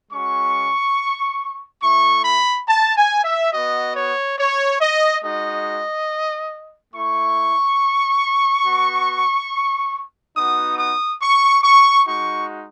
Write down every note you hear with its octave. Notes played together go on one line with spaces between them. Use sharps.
G#3 C#4 F#4 C#6
A3 E4 C#6
B5
A5
G#5
E5
B3 F#4 D#5
C#5
C#5
D#5
G#3 D#4 F#4 D#5
A3 E4 C#6
B3 F#4
B3 D#4 F#4 D#6
D#6
C#6
C#6
G#3 D#4 F#4 C#6